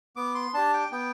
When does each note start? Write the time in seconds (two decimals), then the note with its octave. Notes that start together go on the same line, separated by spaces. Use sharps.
0.16 B3 D6
0.35 C6
0.54 D4 G4 A5
0.74 G5
0.92 B3 G5